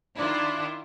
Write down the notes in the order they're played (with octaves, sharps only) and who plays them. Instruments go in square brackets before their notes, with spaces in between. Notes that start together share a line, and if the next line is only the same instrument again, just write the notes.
[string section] D#3 E4 F4 [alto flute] D4